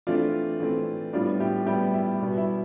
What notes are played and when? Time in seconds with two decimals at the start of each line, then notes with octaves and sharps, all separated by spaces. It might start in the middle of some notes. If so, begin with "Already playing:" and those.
0.07 E3 A3 C4 D4 F4
0.60 E3 A3 C4
1.13 A2 G3 B3 D4 F4
1.40 E4 G4
1.66 A2 G3 B3 E4 G4
1.94 E4
2.21 B2 G3 B3
2.38 E4